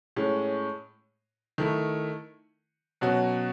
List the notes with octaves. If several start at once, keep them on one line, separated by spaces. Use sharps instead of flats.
A2 G#3 C#4
D#3 A3 E4
B2 F#3 C#4 F#4